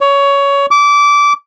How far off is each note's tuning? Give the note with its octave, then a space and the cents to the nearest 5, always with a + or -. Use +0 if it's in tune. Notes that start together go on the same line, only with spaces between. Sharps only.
C#5 +15
D6 -20